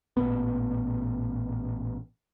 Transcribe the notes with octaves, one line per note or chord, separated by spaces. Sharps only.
A1 A#2 B3